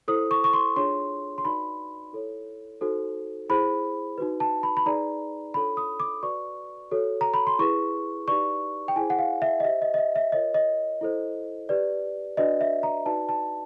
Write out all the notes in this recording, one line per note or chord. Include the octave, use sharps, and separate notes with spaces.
E4 A4 C5 D#6
C#6
C#6
C6
D4 F4 G#4 C#5 C6
C6
D#4 F#4 B4 D5 B5
E4 A4 C#5
D#4 F#4 A4 C5
E4 G#4 C5 B5
D#4 F#4 B4
A5
B5
B5
D#4 G#4 B4 D5 A#5
D4 F4 A4 C#5 B5
D#6
D6
F#4 B4 D5 C#6
F#4 A4 C#5
A#5
B5
C6
E4 G#4 B4 C#6
D#4 G4 B4 D5 C#6
G5
E4 G#4 C5 G#5
F#5
F5
E5
D#5
G4 C5 E5
D#5
D#5
E5
E5
F4 A#4 C#5 D#5
D#5
E4 A4 C5
G4 B4 D5
D4 F#4 B4 D5 D#5
E5
A#5
D#4 F#4 B4 D5 A5
A5